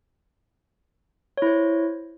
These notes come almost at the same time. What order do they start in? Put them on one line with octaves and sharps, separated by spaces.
C#5 E4 C5